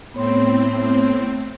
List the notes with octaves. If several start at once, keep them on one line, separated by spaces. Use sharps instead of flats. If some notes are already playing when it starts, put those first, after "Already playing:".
A2 B3 C4 C#5 C6